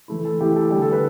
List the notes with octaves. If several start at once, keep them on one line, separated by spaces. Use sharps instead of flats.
E3 A3 E4
A4
E3 A3 E4 G4
A4
D3 G3 D4 G4
A4
B4